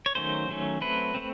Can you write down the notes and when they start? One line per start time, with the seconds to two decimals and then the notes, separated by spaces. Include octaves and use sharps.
0.06 C#5
0.15 D#3 F#3 A3 C#4 C5
0.49 D#3 F#3 A3 C#4
0.81 F#3 A3 C4 B4
1.14 A3 C4